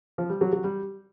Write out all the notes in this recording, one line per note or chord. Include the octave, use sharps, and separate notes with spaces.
F3
G3
F#3
F#3
G3